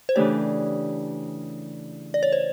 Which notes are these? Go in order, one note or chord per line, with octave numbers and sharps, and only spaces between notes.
C5
C#3 E3 A3 D4 G4 C#5
D5
C#5
C5